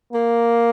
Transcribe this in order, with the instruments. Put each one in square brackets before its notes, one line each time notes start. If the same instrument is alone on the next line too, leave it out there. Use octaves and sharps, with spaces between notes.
[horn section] A#3